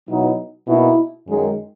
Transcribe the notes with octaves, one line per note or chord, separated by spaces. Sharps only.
B2 F#3 B3 D#4 E4
B2 A#3 D#4 E4
F#2 D#3 G#3